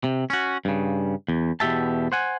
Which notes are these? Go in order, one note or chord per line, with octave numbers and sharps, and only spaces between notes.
C3
C#4 F#4
G2 C#3
E2
E2 B2 G4 E5 A5
C5 F#5 G#5